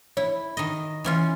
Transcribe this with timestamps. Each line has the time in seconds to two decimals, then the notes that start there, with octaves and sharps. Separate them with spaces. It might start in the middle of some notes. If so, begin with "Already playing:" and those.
0.17 E4 C#5
0.57 D#3 D#5
1.04 E3 C#4 F4